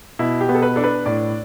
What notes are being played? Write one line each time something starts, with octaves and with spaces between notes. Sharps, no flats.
B2 E4
G4
B3
A4
B4
D4 A4
B4
A2 D5